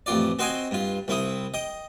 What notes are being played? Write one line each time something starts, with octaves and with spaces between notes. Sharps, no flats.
A1 F2 F4 D5
C4 F#4 C5 D#5 G5 G#5
G2 F4
C2 C4 E4 D#6
D#5 G5